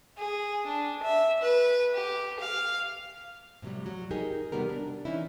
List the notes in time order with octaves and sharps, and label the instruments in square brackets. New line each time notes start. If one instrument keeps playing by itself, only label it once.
[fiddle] G#4
D4
E5
B4
G4
F5
[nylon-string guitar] A2 C3 D#3 F#3 G3
F#3
D#4 G4 G#4 A#4
C3 D#3 G3 B3 A#4
D4
E3 C#4 D#4 E4